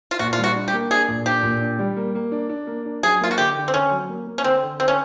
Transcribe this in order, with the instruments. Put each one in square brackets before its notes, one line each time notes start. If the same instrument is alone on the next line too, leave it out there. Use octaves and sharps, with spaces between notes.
[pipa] F4
[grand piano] A#2 [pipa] F#4
[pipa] F4
[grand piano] G3
[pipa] F#4
[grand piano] D4
[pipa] G4
[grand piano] A#3
[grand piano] D4 [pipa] G#4
[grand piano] A#2
[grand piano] D4 [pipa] G4
[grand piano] A#2
D4
G3
A#3
A#3
D4
D4
A#3
D4
[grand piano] F#3 [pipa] G#4
[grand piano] A#3 [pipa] F4
[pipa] F#4
[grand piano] D3 [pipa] G4
[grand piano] D3
[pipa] C4
[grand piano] D3 [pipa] C#4
[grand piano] F#3
A#3
A#3
[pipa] C#4
[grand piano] D3 [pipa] C4
[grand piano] D3
[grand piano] D3 [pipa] C4
[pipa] C#4